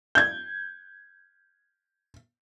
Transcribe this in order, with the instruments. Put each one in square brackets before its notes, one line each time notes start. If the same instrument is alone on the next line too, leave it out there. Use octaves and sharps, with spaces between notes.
[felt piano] G6 G#6